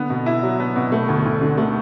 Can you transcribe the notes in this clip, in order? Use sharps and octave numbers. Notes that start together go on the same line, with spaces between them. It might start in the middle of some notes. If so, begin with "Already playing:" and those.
Already playing: D3 B3
B2
E4
F#3
B3
B2
A3
D2
D2
D3
A3